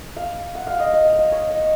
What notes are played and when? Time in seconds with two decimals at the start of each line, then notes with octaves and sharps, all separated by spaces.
0.16 F5
0.55 F#5
0.67 F5
0.80 D#5
0.94 D#5
1.05 F5
1.18 D#5
1.32 C#5
1.50 D#5